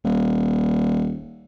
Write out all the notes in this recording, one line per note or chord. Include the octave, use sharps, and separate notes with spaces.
D#1